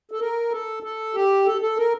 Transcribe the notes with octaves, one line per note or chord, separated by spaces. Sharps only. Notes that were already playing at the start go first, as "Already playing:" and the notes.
A4
A#4
A4
A4
G4
A4
A4
A#4